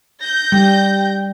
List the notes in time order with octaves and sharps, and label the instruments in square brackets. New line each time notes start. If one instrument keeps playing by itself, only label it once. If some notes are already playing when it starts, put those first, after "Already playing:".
[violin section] G6 A#6
[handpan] G3 [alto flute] G5